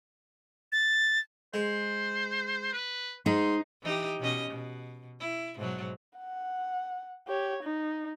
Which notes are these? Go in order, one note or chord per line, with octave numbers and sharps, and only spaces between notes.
A6
G#3 C5
B4
G#2 D#4 C6
E3 D#4 G4
B2 C#4 D#5
B2
E4
G#2 B2 F#3
F#5
G4 C#5
D#4